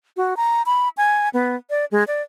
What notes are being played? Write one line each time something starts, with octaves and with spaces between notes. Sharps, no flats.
F#4
A#5
B5
G#5
B3
D5
G#3
D5